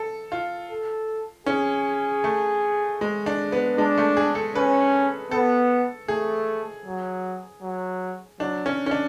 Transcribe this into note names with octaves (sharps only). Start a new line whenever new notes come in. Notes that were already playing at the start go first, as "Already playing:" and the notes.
Already playing: A4
F4
A4
C#4 G#4
A3
G#3
D4
B3
G#3 D4
A3
G#4
A4
C#4 B4
B3 A4
A3 G#4
F#3
F#3
F#3 D4
C#4
C#4
D4